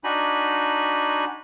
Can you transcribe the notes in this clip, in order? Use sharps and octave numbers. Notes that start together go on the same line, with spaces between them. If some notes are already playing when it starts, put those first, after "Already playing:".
D4 D#4 F#4 G#5 B5